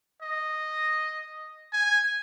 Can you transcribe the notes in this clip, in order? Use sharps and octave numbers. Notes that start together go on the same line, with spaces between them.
D#5
G#5